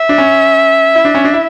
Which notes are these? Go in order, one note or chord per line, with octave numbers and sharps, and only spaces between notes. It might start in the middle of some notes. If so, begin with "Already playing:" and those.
Already playing: E5
D4
C#4
E4
D4
C#4
D4
E4